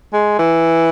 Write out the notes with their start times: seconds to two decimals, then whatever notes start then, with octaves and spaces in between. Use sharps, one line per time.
0.13 G#3
0.39 E3